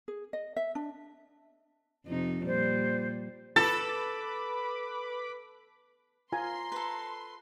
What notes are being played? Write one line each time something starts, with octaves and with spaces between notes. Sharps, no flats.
G#4
D#5
E5
D4
F2 C3 D#4
A#2 G3 C5
A4 B4 B5 D6 A6
F4 G#5 A#5 C6
A4 B4